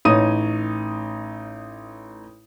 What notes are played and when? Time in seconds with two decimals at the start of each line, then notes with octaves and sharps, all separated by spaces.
0.05 A1 D#4 C#5 D#6 D#7